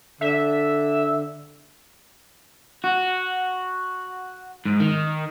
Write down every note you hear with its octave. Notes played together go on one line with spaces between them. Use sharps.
D3 E5
F#4
G#2
D#3